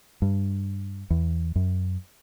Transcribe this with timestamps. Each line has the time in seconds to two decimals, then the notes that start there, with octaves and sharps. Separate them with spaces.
0.22 G2
1.10 E2
1.56 F#2